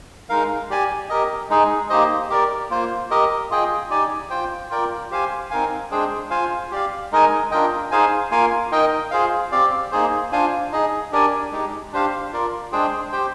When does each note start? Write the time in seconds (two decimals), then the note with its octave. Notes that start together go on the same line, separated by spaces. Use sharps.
0.29 G#3 D#4 A#4 F5
0.70 G4 D5 G#5
1.09 G4 A#4 D#5
1.50 G#3 D#4 G#4
1.90 A#3 D#4 G4 C5 D#5
2.30 G4 A#4 D5
2.70 A#3 F4 C5
3.11 G4 A#4 D#5
3.50 F4 G#4 D#5 G5
3.90 D#4 G4 D5 G#5
4.30 F4 C5 G5
4.70 F4 A#4 D5 G5
5.11 G4 C5 F5 G#5
5.51 C4 D#4 A#4 F5 G#5
5.91 G#3 D4 G#4 C5 G5
6.30 F4 C5 F5 G#5
6.71 G4 D5 F5
7.12 G#3 D#4 A#4 D#5 G#5
7.51 D4 F4 A#4 D#5 G5
7.91 D#4 G#4 C5 F5 G#5
8.31 A#3 F4 A#4 F5 G#5
8.71 D#4 A#4 D#5 G5
9.11 F4 G#4 C5 F5
9.52 C4 G4 D5 F5
9.92 A#3 D#4 G#4 C5
10.32 D4 F4 C5 F5 G#5
10.72 D#4 G#4 D#5
11.12 D4 G4 A#4 D5 G#5
11.52 G#3 D#4 G4
11.92 D4 G4 C5 F5
12.32 F4 A#4 D5
12.72 G#3 D4 G#4 C5 G5
13.12 G4 C5 G5